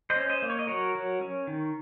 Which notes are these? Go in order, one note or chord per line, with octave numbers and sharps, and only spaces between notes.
C5 D#5
C#4
C5 D#5
A#3
C#5
D#5
F#3 A#4 C#5
F#3
C#4
D#3